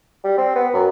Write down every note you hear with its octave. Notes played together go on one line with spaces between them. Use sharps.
G3
C4
B3
F#2